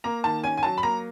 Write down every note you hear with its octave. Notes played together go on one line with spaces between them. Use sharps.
A#3 A#5
D#3 A5
C#4 G#5
G#5
F#3 A5
B5
A#3 A#5